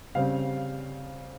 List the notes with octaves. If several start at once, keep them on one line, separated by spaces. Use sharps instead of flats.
C#3 G3 C4 F5